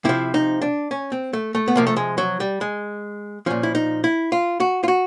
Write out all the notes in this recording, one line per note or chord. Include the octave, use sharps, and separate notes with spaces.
C3 F3 E4
D#4
D4
C#4
C4
A3
A3
B3
C3 F3 A#3
A3
G#3
F#3
G3
G#3
A#2 F3 C#4
E4
D#4
E4
F4
F#4
F4
F#4